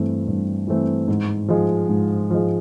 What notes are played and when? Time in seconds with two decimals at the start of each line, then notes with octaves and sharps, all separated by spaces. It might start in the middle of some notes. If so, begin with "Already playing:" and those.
Already playing: G2 E3 A3 C4
0.28 G2
0.68 E3 A3 C4
1.08 G#2
1.48 F3 G#3
1.89 G#2
2.31 F3 G#3